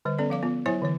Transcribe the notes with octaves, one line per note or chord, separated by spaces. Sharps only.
D3 G3 C5
B3 C#4 A4 D5
F3 F5 D6
B3 F4
F#3 E4 C5 C#5 G#5
D3 E3 C#5